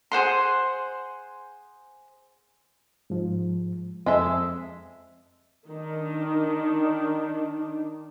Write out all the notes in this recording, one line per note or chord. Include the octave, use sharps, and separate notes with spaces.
G#4 C5 F#5 C6
G#2 F3
F2 G#3 C4 A4 E5
D#3 D4